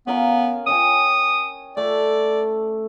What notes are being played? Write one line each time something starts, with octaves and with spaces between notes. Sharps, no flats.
B3 C#4 A#4 F5
C#4 G5 G#5 D#6
A3 D5